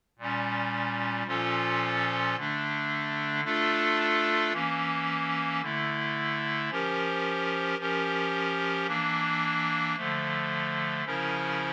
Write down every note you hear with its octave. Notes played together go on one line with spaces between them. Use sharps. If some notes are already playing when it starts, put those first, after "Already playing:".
A#2 G3 C#4
A#2 F3 C#4 F4 A4
D3 A3 D4
A3 D4 F4 A4
E3 A#3 C#4
D3 A3 E4
F3 C#4 G4 A#4
F3 C#4 G4 A#4
E3 A#3 D4
D3 F3 A3
C#3 F3 C#4 E4 A#4